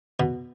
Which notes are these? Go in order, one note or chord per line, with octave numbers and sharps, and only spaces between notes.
B2